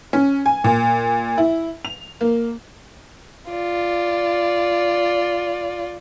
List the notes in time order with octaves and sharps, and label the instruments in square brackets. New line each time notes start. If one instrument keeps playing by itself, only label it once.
[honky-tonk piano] C#4
G#5
A#2
E4
F7
A#3
[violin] F4 D5